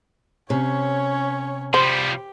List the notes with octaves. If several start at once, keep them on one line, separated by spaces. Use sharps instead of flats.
C3 C#4 C#5
F3 G3 G4 C5